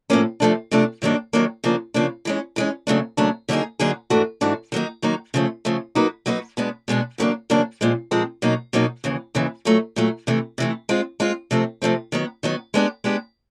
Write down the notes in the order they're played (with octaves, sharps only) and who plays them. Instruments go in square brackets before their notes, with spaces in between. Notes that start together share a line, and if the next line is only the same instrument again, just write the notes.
[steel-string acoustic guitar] A2 F3 A#3 C#4
C3 F3 A3 D4
C3 F3 A3 D4
G2 D#3 F#3 A#3 D4
G2 D#3 F#3 A#3 D4
C#3 F3 A#3 D4
C#3 F3 A#3 D4
E3 G#3 C#4
E3 G#3 C#4
D#2 C#3 F#3 A3 D4
D#2 C#3 F#3 A3 D4
D3 F#3 A#3 D#4 G#4
D3 F#3 A#3 D#4 G#4
G#2 E3 A3 D4 F#4
G#2 E3 A3 D4 F#4
D#3 F#3 A#3 D#4
D#3 F#3 A#3 D#4
C#3 F3 A3
C#3 F3 A3
F#3 A#3 D#4 F#4 B4
F#3 A#3 D#4 F#4 B4
B2 G#3 B3 D4
B2 G#3 B3 D4
E2 C#3 F#3 A#3 D4
E2 C#3 F#3 A#3 D4
A#2 F3 G#3 C4
A#2 F3 G#3 C4
B2 F#3 A#3 D#4
B2 F#3 A#3 D#4
D#2 C#3 E3
D#2 C#3 E3
A#2 F#3 A3
A#2 F#3 A3
C3 E3 A3
C3 E3 A3
G#3 C4 F4
G#3 C4 F4
C3 F3 A3 C4
C3 F3 A3 C4
D#3 F#3 B3
D#3 F#3 B3
G#3 B3 D4 G4
G#3 B3 D4 G4